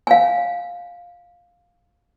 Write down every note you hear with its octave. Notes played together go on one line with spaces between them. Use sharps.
F5 G#5